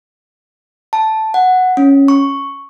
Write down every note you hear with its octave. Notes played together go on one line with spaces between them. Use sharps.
A5
F#5
C#4
C#6